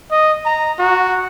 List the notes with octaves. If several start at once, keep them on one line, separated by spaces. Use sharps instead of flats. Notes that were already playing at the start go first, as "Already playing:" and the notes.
D#5
A#5
F#4